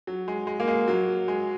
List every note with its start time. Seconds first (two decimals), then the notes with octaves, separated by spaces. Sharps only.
0.07 F#3
0.28 G#3
0.47 G#3
0.60 A#3
0.68 G#3
0.88 F#3
1.28 G#3